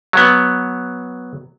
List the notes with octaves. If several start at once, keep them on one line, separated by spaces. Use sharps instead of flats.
F#3 B3